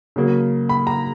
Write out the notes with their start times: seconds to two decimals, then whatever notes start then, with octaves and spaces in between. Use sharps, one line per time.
0.16 C#3 F#3 A#3
0.69 B5
0.87 A#5